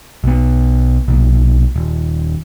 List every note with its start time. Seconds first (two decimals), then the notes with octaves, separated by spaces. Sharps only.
0.24 B1 B3
1.08 B1 A#2
1.76 D#1